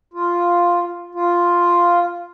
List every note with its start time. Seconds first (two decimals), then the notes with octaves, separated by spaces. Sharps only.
0.14 F4
1.15 F4